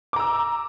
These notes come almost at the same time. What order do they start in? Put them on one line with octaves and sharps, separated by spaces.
D6 A#5 E6